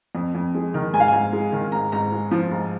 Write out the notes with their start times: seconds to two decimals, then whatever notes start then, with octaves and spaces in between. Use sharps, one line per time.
0.15 F2
0.35 F2
0.55 G#3
0.74 D#3
0.93 G#2 G#5
1.00 F5
1.08 G#2 G#5
1.33 G#3
1.52 D#3
1.72 G#2 A#5
1.92 G#2 A#5
2.12 G#3
2.31 F3
2.51 G#2